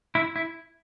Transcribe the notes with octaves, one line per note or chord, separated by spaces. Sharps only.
E4
E4